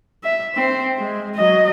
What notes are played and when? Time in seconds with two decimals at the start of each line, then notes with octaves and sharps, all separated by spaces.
0.24 E5
0.55 C4 C5
0.98 G#3
1.36 F#3 D#5